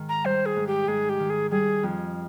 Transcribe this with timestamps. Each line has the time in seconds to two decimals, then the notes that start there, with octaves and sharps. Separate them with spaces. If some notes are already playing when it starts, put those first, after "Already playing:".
Already playing: G#2 D#3
0.09 A#5
0.24 G3 C5
0.46 G#4
0.56 G#2
0.67 G4
0.88 G#2 G#4
1.09 G4
1.19 D#3
1.30 G#4
1.51 G3 G#4
1.83 F2